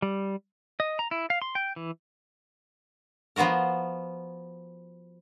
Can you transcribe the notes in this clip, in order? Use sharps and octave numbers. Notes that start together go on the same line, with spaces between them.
G3
D#5
A#5
E4
F5
C6
G5
E3
F3 B3 F4 F#4 A#4